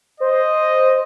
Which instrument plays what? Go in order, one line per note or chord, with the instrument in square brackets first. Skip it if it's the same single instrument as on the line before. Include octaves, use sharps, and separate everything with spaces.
[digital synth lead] C5 [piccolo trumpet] D#5